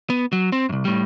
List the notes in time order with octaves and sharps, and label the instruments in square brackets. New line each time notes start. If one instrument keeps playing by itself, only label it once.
[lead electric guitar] B3
F#3
C4
C2 F#2
A2 G3